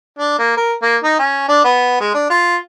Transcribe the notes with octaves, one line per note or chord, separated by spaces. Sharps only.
D4
A#3
A#4
A#3
D#4
C#4
D4
B3
G#3
D4
F4